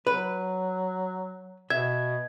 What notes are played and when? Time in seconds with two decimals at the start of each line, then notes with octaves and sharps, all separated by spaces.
0.07 F#3 B4
1.70 B2 E5 G#6